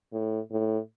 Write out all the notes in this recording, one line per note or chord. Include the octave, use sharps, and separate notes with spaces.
A2
A2